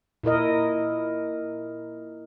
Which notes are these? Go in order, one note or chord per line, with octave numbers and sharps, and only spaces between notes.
A#2 E4 A#4 D#5